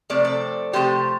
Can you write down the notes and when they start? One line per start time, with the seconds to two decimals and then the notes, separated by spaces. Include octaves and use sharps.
0.10 C3 F3 A3 C4 D5
0.25 A4 D5
0.73 C3 F3 A3 G4 C5